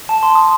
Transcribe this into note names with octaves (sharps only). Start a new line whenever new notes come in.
A5
C6
D#6